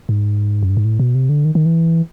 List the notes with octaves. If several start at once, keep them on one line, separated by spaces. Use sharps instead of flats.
G#2
F#2
G2
G#2
A2
B2
C3
D3
D#3
D#3
E3